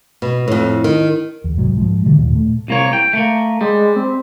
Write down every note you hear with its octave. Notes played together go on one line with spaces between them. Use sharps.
B2
F2 A2
D#3
E2
C2 G#2 F#3
G#2 F3
A2 D3 E3 G3
D#2 A#2
A#2 A3
C2 A#3 C#5
G5
A3 A#3
G3 G#3
C4